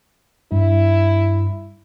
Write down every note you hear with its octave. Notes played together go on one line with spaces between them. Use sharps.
G2 E4